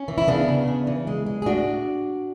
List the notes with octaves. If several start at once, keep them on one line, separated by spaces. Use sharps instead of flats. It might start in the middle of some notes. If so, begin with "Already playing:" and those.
Already playing: C#4
E3
E4
C#3 B3 D4
C#3
C#3
E3
G#3
G#3
G#4
A2 D4 F#4